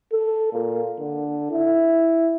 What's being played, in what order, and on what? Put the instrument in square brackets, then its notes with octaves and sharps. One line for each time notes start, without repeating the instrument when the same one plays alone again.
[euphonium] A4
A#2
D3
E4